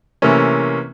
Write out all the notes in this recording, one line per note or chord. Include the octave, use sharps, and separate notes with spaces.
C3 E3 A3 A#3 C#4